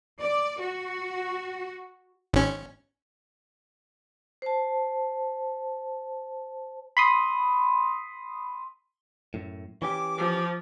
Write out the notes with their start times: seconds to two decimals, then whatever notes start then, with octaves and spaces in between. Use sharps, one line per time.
0.19 D5
0.59 F#4
2.33 G#1 C#4
4.42 C5 A5
6.97 B5 C6 D#6
9.34 F#2 A2
9.82 E3 C#4 G4 D6
10.18 F3